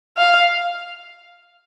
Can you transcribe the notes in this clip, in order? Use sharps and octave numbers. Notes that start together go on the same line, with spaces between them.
F5